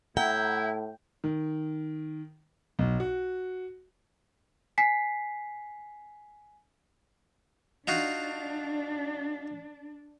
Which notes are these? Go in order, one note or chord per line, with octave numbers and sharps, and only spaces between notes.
A2 E4 E5 F#5 G5 A#5
D#3
B1
F#4
G#5 B6 C7
D4 D#4 F4 F#4